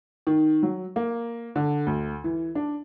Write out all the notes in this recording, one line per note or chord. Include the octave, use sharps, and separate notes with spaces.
D#3
F#3
A#3
D3
D2
E3
D4